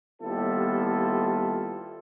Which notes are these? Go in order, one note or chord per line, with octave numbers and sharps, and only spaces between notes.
D#2 G3 B3 E4 F4 A4